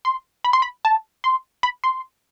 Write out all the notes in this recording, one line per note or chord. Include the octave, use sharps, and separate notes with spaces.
C6
B5
C6
B5
A5
C6
B5
C6